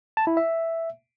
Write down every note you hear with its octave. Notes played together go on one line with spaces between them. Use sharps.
A5
E4
E5